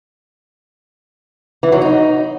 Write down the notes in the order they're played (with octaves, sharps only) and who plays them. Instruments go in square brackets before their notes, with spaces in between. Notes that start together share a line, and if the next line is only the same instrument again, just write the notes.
[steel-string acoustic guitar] E3
F#3
D#4